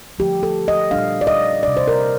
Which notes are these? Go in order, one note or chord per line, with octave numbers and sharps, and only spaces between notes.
D3 F3 A3 G4
A4
D#5
A#2 G3 D4 F5
D5
D#5
C3 G3 D4 D5
C5
A#4